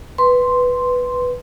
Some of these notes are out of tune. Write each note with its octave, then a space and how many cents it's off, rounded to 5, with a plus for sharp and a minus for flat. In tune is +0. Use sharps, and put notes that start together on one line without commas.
B4 +0 C6 +0